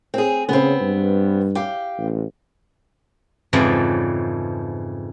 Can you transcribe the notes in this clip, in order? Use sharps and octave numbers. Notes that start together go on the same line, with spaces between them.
C4 G#4
C#3 B3 C4
G2
G4 F5
A1
F2 G#2 C#3 E3 F3 D5